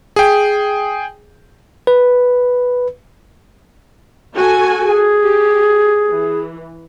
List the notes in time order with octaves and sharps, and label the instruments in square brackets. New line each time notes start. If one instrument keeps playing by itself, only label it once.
[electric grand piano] G#4 G5
[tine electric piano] B4
[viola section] F#4 A4 G#5
[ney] G#4
[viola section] G4
E3